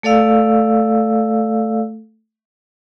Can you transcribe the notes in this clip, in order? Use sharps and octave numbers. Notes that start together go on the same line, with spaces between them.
A3 A4 D5 F5 E6